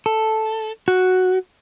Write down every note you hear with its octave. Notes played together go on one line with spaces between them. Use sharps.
A4
F#4